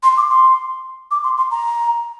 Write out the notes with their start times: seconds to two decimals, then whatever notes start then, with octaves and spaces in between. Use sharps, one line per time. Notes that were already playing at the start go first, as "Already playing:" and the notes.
0.03 C6
0.17 D6
0.30 C6
1.11 D6
1.24 C6
1.37 C6
1.51 A#5